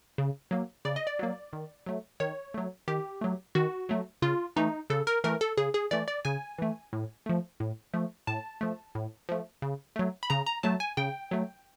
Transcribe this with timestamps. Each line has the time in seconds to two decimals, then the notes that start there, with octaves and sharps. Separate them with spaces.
0.18 C#3
0.51 F#3 A#3
0.85 C#3 D5
0.96 D#5
1.07 D5
1.19 F#3 A#3
1.53 D#3
1.86 F#3 A3
2.20 D#3 C#5
2.54 F#3 A3
2.88 D#3 G4
3.21 F#3 A3
3.55 D#3 F#4
3.89 F#3 A3
4.22 C#3 F4
4.56 E3 A3 D#4
4.90 C#3 A4
5.07 A#4
5.24 E3 A3 A#4
5.41 A4
5.57 C#3 G#4
5.74 G#4
5.91 E3 A3 D5
6.08 D5
6.25 C#3 G#5
6.58 E3 A3
6.93 A2
7.26 F3 A3
7.60 A2
7.93 F3 A3
8.27 A2 A5
8.61 F3 A3
8.95 A2
9.29 F3 A3
9.62 C#3
9.96 F#3 A3
10.23 B5
10.30 C#3 A#5
10.46 A#5
10.63 F#3 A3 A5
10.80 G#5
10.97 C#3 G5
11.31 F#3 A3